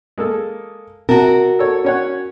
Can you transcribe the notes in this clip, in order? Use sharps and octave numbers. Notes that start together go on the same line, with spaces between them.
G#3 A#3 A4
C3 F#4 A#4 A5
A4 C#5
C#4 C#5 F#5